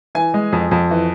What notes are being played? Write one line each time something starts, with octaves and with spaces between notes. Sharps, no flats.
E3 G#5
G#3
F2
F2
E3